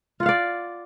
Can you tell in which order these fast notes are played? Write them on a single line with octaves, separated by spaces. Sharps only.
F4 F#5 F5 D5